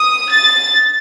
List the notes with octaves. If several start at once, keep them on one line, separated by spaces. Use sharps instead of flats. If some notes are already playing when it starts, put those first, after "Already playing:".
Already playing: D#6
A6